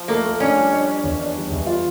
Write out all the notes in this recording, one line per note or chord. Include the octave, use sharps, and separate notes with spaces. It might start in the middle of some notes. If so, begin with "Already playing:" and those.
Already playing: F3
A3 A#3
A3
C#4 D4
G3
D4
D4
E2
D4
G3
E2
F4